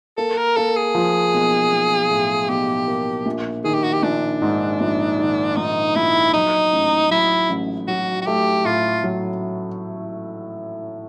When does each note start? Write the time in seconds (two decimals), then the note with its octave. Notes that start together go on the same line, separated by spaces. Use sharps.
0.17 A#3 A4
0.38 A#4
0.56 A#3 A4
0.76 G#4
0.95 F3
1.34 B1
1.72 B1
2.11 A2
2.49 B1 G4
2.88 A#3
3.26 A#1
3.64 D#3 G#4
3.74 G4
3.84 F#4
3.93 G4
4.03 A#1 D4
4.42 G#2
4.80 A#1
5.19 D#3
5.57 A#1 D#4
5.96 A#1 E4
6.33 F#3 D#4
6.72 A1
7.11 F#3 E4
7.49 A1
7.88 F#3 F#4
8.22 F#4
8.26 A3 G4
8.65 A2 F4
9.04 F#3